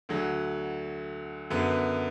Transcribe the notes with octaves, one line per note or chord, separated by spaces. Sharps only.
D2 D3 F#3
F#2 D3 B3